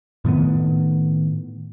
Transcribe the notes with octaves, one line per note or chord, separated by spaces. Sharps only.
A2 D#3 A3 B3